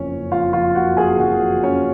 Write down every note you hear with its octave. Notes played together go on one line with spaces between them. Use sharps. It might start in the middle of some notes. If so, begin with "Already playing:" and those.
Already playing: F#1 F2 F3 C#4 C#5
F#1
F2 F4 F5
F3 F4 F5
F#1 F#4 F#5
F#1 G#4 G#5
F2 F#4 F#5
F3
F#1 C#4 C#5